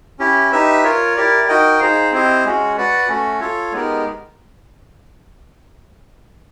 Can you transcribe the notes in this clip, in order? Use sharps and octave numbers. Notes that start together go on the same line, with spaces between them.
C#4 E4 G4
D#4 G4 B4 E5
F4 A#4 C#5
E4 G4 A#4 D5
D#4 F#4 A#4 D#5 G5
D#4 G#4 C5 F5
C4 E4 G4 C5 D#5
G#3 C#4 F#4
F#4 B4 D5 F#5
A3 C#4 F#4
F4 A4 C#5
G#3 B3 D#4 G4 A#4